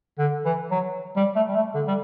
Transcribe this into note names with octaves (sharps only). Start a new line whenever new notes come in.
D3
E3
F#3
G3
A3
G3
A3
D3
G3